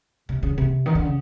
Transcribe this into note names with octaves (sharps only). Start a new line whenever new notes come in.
C3
C#3
C3
D#3
D3
C#3